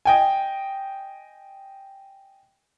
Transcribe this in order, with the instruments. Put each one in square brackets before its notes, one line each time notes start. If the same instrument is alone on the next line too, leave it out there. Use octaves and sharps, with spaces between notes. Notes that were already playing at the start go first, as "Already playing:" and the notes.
[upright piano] D#5 G5 G#5